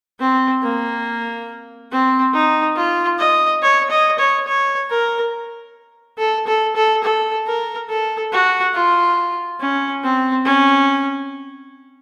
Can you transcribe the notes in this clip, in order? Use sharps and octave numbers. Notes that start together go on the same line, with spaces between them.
C4
A#3
C4
D#4
F4
D#5
C#5
D#5
C#5
C#5
A#4
A4
A4
A4
A4
A#4
A4
F#4
F4
C#4
C4
C#4